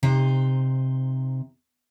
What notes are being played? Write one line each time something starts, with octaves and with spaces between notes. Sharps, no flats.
C3 D#4 C5